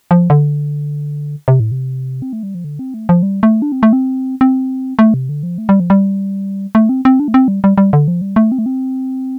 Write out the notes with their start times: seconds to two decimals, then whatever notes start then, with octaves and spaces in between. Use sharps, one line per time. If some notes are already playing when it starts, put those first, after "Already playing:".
0.11 F3
0.30 D3
1.48 C3
1.60 A2
1.72 C3
2.22 C4
2.33 A3
2.43 G3
2.55 F3
2.64 D3
2.79 C4
2.94 A3
3.09 F3
3.23 G3
3.43 A3
3.62 D4
3.72 C4
3.83 A3
3.93 C4
4.41 C4
4.99 A3
5.14 C3
5.29 D3
5.43 F3
5.58 A3
5.69 G3
5.80 F3
5.90 G3
6.75 A3
6.89 C4
7.05 C4
7.20 D4
7.28 A3
7.34 C4
7.48 G3
7.64 G3
7.78 G3
7.93 D3
8.08 F3
8.21 G3
8.36 A3
8.52 C4
8.59 A3
8.66 C4